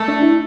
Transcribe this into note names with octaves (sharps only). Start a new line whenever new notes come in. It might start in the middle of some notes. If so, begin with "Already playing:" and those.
Already playing: A3
D4
E4